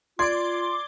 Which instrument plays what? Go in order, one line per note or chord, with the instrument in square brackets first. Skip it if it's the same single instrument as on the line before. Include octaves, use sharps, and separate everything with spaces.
[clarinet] F4 [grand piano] D5 G#6 [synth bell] C6 D6